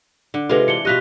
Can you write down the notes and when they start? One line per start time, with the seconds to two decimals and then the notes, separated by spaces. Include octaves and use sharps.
0.34 D3
0.49 C3 G#3 F4 A4 B4
0.68 E3 D4 C#7 G7
0.85 B2 F4 G4 D#5 F#6 B6